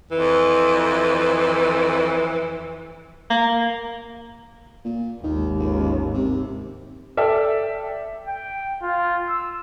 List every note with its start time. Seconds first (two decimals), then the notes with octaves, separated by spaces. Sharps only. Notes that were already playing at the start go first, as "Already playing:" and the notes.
0.11 F2 E3
3.30 A#3
4.84 A#2
5.23 G#1 D#2 D#3
5.59 C#2
6.13 C3
7.17 A4 D5 E5 G5
8.27 G5
8.82 F4
9.29 E6